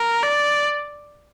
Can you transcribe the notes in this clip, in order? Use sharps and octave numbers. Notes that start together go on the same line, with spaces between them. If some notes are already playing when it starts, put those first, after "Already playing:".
Already playing: A#4
D5